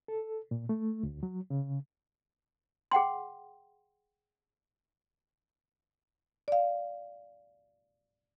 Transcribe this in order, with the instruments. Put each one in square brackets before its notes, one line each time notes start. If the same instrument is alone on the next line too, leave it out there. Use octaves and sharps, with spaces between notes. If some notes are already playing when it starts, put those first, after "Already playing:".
[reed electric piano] A4
A#2
A3
D2
F#3
C#3
[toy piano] G#4 F#5 G5 C6
[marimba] D5 F5